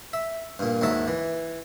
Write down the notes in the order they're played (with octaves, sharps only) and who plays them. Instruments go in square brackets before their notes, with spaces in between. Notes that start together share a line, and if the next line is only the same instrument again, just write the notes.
[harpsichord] E5
G2 A#2
D#2 G#2 F#3 E5 A5
E3